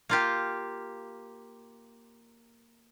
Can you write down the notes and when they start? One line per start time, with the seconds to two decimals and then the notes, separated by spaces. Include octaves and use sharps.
0.09 A#3 F4 G4